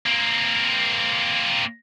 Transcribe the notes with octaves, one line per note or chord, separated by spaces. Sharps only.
A#3 C4